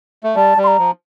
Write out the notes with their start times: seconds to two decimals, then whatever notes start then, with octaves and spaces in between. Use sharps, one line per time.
0.24 A3
0.36 G3 A5
0.57 G3
0.64 C6
0.68 A#5
0.79 F3